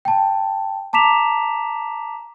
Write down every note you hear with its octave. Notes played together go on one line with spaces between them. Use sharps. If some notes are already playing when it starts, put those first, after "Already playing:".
G5 A5
A5 A#5 D6 B6 E7 F7